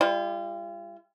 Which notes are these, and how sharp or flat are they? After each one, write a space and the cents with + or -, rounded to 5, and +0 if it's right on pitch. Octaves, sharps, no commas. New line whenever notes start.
G3 +30 F4 -35